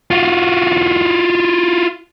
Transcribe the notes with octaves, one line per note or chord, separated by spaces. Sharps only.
F4 F#4